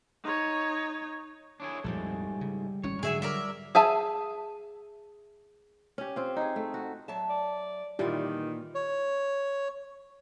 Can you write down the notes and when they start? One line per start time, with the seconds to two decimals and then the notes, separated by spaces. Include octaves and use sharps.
0.24 D#4 C#5
1.60 D4 E4 G#4 C#5
1.84 A#1 F2 G#2 F3 G3 A3
2.41 C#3
2.84 G#1 A2 C#4 C#5
3.03 G#2 D3 F#3 G#4 E5 G#5
3.22 G3 A#4 D5 E5
3.75 G#4 E5 G#5 A5
5.98 C#4 G4
6.16 C4 F4
6.36 D#4 G#4
6.56 A3
6.74 F#4
7.08 F#3 E5 A5
7.29 D5
7.99 A#2 D#3 E3 G3 B3 F4 G4 D5
8.75 C#5